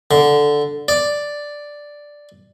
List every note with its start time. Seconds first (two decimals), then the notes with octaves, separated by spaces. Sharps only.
0.11 D3
0.88 D5